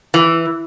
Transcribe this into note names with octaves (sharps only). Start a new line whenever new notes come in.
E3